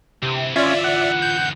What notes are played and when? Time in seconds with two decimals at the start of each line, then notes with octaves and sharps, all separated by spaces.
0.22 D2 C3 E3
0.56 C#4 F4 D5 E5
0.84 F#5
1.22 G6